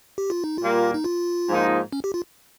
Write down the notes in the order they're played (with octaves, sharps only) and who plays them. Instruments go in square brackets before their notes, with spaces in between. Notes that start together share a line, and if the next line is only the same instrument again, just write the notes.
[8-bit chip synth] G4
F4
D#4
[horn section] A#2 G3 A#3 [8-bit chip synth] F4
[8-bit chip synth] D#4
F4
[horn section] G#2 F3 A#3 D#4
[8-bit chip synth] C#4
G4
F4